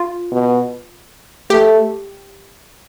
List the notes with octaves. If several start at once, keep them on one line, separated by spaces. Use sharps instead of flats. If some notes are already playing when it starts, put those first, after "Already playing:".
Already playing: F4
B2
A3 G4